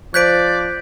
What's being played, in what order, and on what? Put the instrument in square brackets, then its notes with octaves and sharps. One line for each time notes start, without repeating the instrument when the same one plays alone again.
[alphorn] F3 [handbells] C5 F#6 [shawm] D5 [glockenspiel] G6 B6 D7